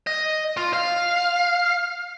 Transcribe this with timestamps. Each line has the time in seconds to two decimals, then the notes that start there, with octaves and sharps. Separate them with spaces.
0.07 D#5
0.57 F4
0.73 F5